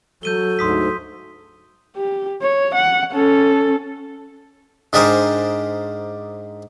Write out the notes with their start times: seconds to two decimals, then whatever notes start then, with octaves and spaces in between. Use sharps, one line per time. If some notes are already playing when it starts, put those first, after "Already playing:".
0.23 F#3 A4 G6 D#7 G7
0.59 D2 G#2 C6 D#6 B6
1.96 G4
2.42 C#5
2.75 F#5
3.12 C#4 A4
4.93 G#2 D4 G4 G#4 A#4 C5